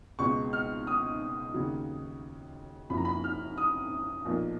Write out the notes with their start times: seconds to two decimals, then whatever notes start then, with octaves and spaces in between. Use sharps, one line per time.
0.19 C#2 B2 G#3 C#6
0.53 F6
0.87 D#6
1.54 D#2 C#3 F#3
2.90 F#1 F#2 F3 B5
2.97 A#5
3.05 B5
3.24 F6
3.58 D#6
4.25 B1 A#2 F3 A#3